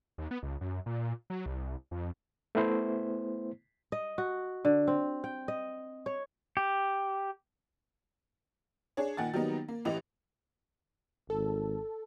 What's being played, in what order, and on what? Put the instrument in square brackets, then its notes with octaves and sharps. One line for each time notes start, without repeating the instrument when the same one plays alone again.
[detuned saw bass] D#2
B3
C#2
F#2
A#2
F#3
C2
F2
[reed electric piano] A3 B3 E4 C5
[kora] D#5
F#4
D3
C4
G5
D#5
C#5
[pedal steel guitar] G4
[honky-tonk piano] D4 G#4 C#5
A#2 D#3 F#5 G#5 A6
D#3 F#3 G3 A#3 B3 D#4
A#3
A1 E3 G4 D#5 F7
[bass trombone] G#1 [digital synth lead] A4